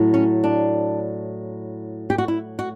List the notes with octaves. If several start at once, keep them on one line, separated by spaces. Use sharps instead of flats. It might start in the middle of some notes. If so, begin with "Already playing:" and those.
Already playing: A2 F#3
C#4
D4
G4
F#4
E4
F#4